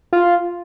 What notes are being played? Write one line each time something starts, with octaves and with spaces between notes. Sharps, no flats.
F4